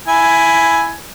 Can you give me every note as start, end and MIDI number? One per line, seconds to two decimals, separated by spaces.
0.08 0.94 64
0.08 0.94 80